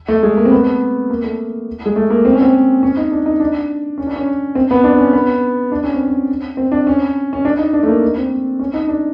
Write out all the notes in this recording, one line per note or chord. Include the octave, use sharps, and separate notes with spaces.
A3
G#3
A#3
C4
B3
A#3
A3
G#3
A3
A#3
C4
C#4
C4
C#4
D#4
D4
D#4
D4
C#4
D4
C#4
C4
B3
D4
C#4
B3
D4
C#4
C4
C#4
C4
D4
C#4
C#4
D4
D#4
D4
A3
A#3
C4
C#4
D#4
D4